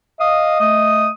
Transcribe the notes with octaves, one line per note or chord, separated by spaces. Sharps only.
D#5 F5 D#6
A3 D#6